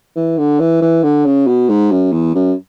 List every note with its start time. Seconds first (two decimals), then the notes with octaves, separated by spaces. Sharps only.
0.16 E3
0.38 D3
0.60 E3
0.82 E3
1.03 D3
1.26 C#3
1.47 B2
1.69 G#2
1.91 F#2
2.12 E2
2.35 F#2